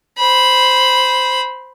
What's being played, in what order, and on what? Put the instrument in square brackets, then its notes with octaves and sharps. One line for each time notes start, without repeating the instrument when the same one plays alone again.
[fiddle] C5 B5